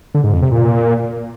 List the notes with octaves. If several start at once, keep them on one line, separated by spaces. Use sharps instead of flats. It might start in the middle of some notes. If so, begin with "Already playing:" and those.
D3
G#2
F2
C3
A#2